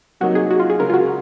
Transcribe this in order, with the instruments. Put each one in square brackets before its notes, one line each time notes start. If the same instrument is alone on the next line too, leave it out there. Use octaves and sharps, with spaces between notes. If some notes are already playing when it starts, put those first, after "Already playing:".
[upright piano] C3 F#3 A#3 D#4 [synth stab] F#4
[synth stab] G#4
F#4
F4
G#4
[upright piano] C#3 G#3 C#4 [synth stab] A#4
[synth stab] F4
F#4